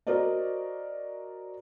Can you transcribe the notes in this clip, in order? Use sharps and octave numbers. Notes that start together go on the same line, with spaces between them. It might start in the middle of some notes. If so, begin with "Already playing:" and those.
F#4 A#4 C5 D5 D#5